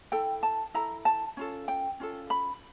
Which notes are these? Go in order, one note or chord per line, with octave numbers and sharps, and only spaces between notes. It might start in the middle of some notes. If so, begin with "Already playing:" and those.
E4 A4 G5
A5
E4 A4 A#5
A5
C#4 F4 A4
G5
C#4 F4 A4
B5